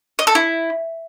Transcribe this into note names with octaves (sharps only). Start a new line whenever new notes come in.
D#5
A4
E4